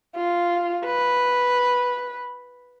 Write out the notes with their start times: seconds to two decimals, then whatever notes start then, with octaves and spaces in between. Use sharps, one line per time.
0.16 F4
0.86 B4